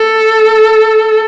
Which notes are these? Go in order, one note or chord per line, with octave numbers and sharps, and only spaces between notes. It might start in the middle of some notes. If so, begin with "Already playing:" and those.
Already playing: A4